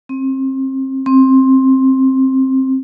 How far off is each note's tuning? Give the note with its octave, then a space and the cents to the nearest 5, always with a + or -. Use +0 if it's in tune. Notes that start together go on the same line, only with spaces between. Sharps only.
C4 +30
C4 +15